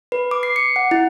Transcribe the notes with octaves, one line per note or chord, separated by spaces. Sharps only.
B4
D6
C7
C#7
F#5
E4